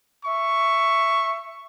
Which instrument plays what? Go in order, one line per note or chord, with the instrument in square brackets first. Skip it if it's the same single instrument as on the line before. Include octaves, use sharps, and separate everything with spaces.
[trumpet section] E5 C#6